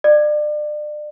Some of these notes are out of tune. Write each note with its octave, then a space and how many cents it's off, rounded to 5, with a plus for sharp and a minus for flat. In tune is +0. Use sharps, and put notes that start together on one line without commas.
D5 +30